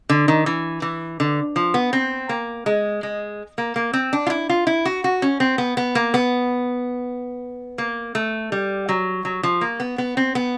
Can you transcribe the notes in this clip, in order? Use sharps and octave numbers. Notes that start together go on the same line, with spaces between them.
D3
D#3
E3
E3
D3
F3
B3
C4
A#3
G#3
G#3
A#3
A#3
C4
D4
F4
E4
F4
E4
F#4
F#4
C#4
C4
B3
B3
A#3
B3
A#3
A3
G3
F#3
F#3
F3
A#3
B3
B3
C4
B3